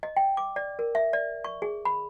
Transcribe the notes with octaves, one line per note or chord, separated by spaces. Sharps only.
D#5
G5
D6
D5
A#4
E5
D5
C#6
G#4
B5